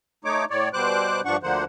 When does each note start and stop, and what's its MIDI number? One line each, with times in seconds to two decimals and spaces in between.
0.25 0.45 57
0.25 0.45 63
0.25 0.45 73
0.25 0.45 86
0.50 0.69 45
0.50 0.69 73
0.50 0.69 74
0.73 1.21 47
0.73 1.21 55
0.73 1.21 72
0.73 1.21 86
0.73 1.21 90
1.25 1.37 43
1.25 1.37 53
1.25 1.37 62
1.25 1.37 78
1.25 1.37 85
1.43 1.64 38
1.43 1.64 50
1.43 1.64 53
1.43 1.64 58
1.43 1.64 72
1.43 1.64 78